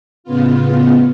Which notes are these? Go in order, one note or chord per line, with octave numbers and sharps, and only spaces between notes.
A2 C#3 B3 F4